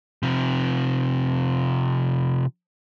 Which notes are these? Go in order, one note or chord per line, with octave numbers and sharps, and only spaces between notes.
C3 F3